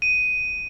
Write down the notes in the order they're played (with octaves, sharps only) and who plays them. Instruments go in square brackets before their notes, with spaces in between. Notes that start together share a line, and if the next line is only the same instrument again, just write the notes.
[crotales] D#7